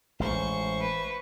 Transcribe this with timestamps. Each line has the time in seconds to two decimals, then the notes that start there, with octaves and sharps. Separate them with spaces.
0.20 A1 G#3 C5 C#6
0.81 B4